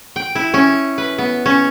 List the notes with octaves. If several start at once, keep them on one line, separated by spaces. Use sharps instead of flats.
G5
E4
C#4
B4
B3
C#4